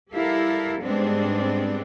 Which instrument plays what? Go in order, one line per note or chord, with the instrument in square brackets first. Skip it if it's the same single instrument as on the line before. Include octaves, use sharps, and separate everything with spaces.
[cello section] G3 E4 G4 A4 A#4 F5
G#2 G3 G#3 B3 C4 D4